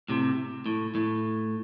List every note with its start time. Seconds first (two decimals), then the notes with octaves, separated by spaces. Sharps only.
0.09 A2 C3
0.66 A2
0.95 A2